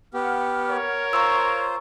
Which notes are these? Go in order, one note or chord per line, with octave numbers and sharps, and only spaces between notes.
B3 G4 F#5 F6
A#4 C#5
F4 C5 F5 A#5 C#6 E6